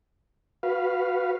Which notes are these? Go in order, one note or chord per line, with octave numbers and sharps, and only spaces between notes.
F#4 B4 F5